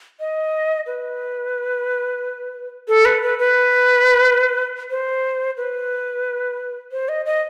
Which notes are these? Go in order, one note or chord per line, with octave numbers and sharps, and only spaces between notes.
D#5
B4
A4
B4
B4
B4
C5
B4
C5
D#5
D#5